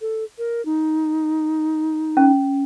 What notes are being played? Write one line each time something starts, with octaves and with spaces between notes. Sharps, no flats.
A4
A#4
D#4
C#4